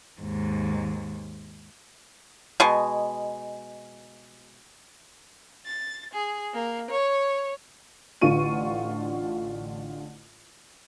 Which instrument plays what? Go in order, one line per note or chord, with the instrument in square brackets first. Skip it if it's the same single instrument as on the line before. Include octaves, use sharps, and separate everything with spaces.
[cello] D#2 G#2
[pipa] B2 G#3
[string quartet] A6
G#4
A#3
C#5
[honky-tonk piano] A1 D3 F4 C#6 D#7